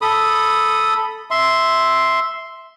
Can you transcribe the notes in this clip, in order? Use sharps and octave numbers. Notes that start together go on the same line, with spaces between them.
A4 B5 D#6
E5 C6